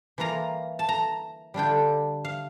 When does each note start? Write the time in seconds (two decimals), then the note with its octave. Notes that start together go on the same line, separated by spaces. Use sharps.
0.18 E3 A#3 F4 A#5
0.79 A5
0.89 A#5
1.54 D3 G3 D4 F4 G5
2.25 F5